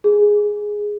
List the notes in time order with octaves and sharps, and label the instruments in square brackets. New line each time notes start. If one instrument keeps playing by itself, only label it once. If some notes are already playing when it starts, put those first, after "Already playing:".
[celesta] G#4